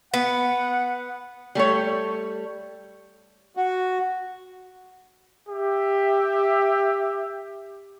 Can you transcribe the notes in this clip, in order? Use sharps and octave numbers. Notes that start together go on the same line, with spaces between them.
B3 F#5
G3 A3 A4 C#5
F#4
G4 E5